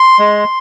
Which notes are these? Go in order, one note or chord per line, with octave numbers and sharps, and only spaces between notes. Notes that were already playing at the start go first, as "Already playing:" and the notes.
Already playing: C6
G#3